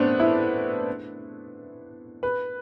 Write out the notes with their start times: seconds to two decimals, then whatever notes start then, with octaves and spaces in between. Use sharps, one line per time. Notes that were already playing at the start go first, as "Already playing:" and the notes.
Already playing: A3 B3 C4 D4
0.20 E4
2.23 B4